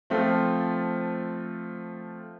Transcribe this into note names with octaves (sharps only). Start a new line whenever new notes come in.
F3 A3 C4 F4 A4